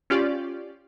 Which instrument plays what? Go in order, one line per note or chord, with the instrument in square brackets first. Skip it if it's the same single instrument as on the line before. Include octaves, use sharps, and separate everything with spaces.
[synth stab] C#4 F4 G4 D5